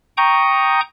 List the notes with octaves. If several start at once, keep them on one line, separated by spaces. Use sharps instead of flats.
G5 A#5 C#6 D#6 G6